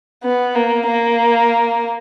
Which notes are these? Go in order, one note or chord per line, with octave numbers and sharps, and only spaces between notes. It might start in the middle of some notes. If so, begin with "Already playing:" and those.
B3
A#3
A#3